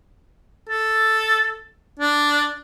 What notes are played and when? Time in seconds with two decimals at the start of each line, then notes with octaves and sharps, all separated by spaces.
0.69 A4
1.99 D4